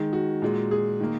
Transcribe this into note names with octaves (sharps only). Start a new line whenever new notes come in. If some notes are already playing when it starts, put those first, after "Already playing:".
Already playing: D#3 G#3
F#4
A#2 G#3
G#4
D#3 A#3